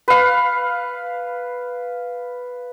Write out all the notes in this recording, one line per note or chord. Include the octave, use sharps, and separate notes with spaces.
B4 F5